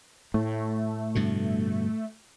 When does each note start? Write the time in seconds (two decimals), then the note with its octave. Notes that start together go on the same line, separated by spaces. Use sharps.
0.34 A2 A3
1.15 G2 B2 D3